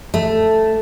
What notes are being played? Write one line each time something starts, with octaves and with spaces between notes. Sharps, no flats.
A3